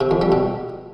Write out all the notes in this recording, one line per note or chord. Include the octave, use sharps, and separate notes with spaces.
C3
F2
G3
B2